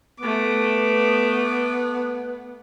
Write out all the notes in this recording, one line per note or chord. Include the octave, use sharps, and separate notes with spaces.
A3 B3 D6